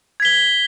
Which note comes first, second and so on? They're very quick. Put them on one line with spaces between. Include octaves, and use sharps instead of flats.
G#6 B6 G7